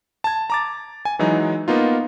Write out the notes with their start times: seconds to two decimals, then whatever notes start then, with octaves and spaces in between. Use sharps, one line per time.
0.24 A5 G#6
0.50 A#5 D6 A6
1.05 G#5
1.19 E3 F#3 G#3 D#4
1.68 A#3 B3 D#4 F4